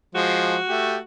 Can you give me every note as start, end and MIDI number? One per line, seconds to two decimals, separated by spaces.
0.15 0.57 53
0.15 0.57 56
0.15 1.03 66
0.68 0.97 57
0.68 0.97 67